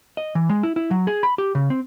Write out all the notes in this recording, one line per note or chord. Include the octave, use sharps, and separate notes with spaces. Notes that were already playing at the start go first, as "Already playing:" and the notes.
D#5
E3
G#3
E4
E4
F#3
G#4
B5
G4
C#3
C4